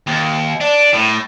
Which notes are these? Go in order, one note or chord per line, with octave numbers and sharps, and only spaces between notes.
D#2
D4
A2